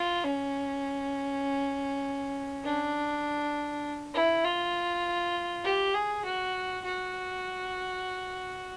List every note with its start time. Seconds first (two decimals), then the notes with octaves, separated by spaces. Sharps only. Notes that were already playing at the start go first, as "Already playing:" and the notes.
Already playing: F4
0.24 C#4
2.64 D4
4.14 E4
4.44 F4
5.64 G4
5.94 G#4
6.25 F#4
6.85 F#4